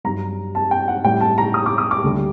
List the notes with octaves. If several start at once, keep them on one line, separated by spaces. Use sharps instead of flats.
G2 F#3 A#5
A5
G5
F#5
A2 G3 G5
A5
A#5
D#6
D6
D#6
D6
D2 D3 G3